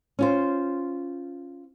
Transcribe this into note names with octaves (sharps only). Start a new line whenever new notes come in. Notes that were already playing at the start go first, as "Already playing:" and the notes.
C#4 F4 C5